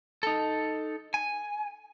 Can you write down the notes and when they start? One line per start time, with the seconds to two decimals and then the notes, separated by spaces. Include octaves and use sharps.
0.23 D#4 A4
1.14 G#5